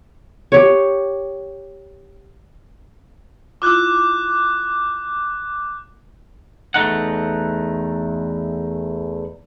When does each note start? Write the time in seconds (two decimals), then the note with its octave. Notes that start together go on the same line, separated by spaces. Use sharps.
0.52 G4 C#5
3.62 E4 F4 D6 F#6 G6
6.74 E2 A3 D#4 F#5